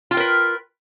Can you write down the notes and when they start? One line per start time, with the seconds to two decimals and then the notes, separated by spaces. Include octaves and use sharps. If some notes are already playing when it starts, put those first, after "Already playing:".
0.11 F4
0.14 G5
0.17 A#4
0.20 B4